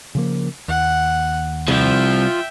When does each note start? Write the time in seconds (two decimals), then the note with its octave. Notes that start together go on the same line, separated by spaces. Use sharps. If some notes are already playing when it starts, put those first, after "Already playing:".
0.15 C#3 F3 A#3
0.68 D#2 F#5
1.68 C2 F3 E5 G5